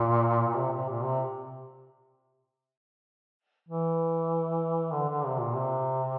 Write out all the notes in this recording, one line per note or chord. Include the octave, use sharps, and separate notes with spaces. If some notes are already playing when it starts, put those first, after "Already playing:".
Already playing: A#2
A#2
C3
C3
A#2
C3
E3
D3
D3
C3
A#2
C3